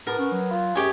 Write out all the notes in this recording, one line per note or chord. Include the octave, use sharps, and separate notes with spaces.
A2 B3 A#4
C#4
F#3
F4
F#2 G4 G#4 C#5